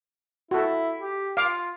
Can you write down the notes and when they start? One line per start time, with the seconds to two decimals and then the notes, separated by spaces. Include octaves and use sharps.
0.51 E4 F#4 A4
1.00 G4
1.37 F4 F5 D6